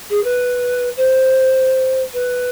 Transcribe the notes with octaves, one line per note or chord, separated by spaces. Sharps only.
G#4
B4
C5
B4